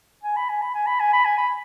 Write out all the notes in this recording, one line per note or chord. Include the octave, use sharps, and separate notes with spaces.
G#5
B5
G#5
B5
G#5
B5
G#5
B5
G#5
B5